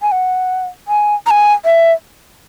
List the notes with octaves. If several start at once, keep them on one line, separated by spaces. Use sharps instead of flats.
G#5
F#5
G#5
A#5
G#5
E5